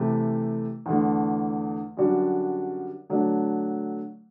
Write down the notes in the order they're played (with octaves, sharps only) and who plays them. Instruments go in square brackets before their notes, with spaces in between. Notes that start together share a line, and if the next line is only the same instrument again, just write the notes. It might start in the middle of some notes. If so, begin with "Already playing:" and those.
Already playing: [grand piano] C3 E3 A3 E4 G4
E2 D3 A3
F#2 D3 G3 D4 F#4
D3 F#3 A3 D4